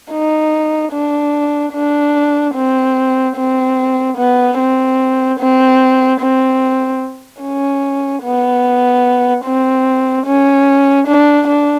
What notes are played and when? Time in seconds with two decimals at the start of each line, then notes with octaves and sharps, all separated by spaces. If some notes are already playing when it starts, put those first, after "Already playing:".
0.12 D#4
0.93 D4
1.74 D4
2.55 C4
3.37 C4
4.17 B3
4.59 C4
5.40 C4
6.21 C4
7.43 C#4
8.24 B3
9.46 C4
10.27 C#4
11.08 D4
11.48 D4